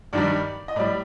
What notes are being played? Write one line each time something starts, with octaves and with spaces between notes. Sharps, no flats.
G2 D#3 G3 D5
D#5
A2 G3 D5